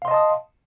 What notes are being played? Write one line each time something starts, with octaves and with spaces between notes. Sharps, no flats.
D#5 F5 A5 C6 D#6